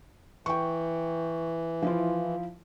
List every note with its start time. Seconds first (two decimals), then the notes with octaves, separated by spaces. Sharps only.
0.46 E3 G5 C#6
1.82 F3 E4 F4